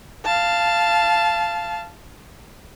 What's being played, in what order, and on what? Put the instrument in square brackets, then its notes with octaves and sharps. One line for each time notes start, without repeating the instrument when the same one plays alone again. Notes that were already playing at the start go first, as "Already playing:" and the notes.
[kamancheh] F5 A5